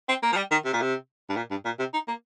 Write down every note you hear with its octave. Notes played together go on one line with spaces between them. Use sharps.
C4
A#3
F3
G3
D#3
C3
A#2
C3
G2
A#2
G2
A#2
C3
D#4
A#3